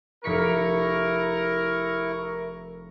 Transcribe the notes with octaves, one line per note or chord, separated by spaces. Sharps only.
F1 E4 A#4 C#6 B6 C#7